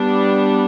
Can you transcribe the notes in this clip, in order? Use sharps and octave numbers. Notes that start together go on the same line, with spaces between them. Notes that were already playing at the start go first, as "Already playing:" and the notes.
Already playing: G3 B3 D4